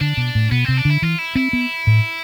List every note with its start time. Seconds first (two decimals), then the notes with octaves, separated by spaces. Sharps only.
0.01 D3 D4
0.17 B2
0.35 A2
0.51 B2 B3
0.64 C3 C4
0.77 D4
0.85 D3 E4
1.02 E3 F4
1.19 E4
1.35 C4 E4
1.53 B3
1.87 A2